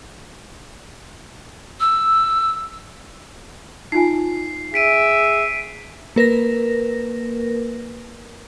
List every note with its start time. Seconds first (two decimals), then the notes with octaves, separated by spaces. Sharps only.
1.80 E6
3.92 D#4 F4 G#5 C7
4.74 G#4 E5 B6 D7 D#7
6.16 A#3 A#4 B4 A#6